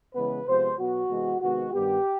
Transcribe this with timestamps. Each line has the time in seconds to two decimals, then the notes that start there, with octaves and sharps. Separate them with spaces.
0.15 C#3 E3 G#3 B3 B4
0.46 C3 F3 G#3 B3 C5
0.78 B2 F#3 B3 F#4
1.09 C3 E3 G#3 B3
1.41 C3 D#3 G#3 B3 F#4
1.72 G2 D#3 G3 B3 G4